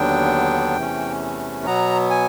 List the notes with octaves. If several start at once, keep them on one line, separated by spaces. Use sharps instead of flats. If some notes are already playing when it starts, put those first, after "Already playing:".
Already playing: D#2 D3 F#3 B3 D4 G5
E2 C3 E3 A3 C#4
B2 F#3 B3 A#5
G#5